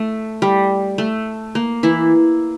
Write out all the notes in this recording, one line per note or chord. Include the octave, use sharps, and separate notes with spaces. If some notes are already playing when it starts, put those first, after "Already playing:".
Already playing: A3
G3
A3
A#3
E3 E4